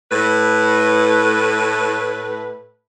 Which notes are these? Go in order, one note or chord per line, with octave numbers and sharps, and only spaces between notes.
A2 B4